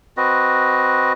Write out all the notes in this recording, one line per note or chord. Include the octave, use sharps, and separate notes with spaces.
C4 F#4 B4 D#5